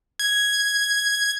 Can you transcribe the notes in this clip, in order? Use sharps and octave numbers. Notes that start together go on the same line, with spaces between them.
G#6